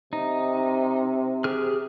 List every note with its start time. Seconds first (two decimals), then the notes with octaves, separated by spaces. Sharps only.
0.13 C3 D#4
1.44 G4 G#4 F6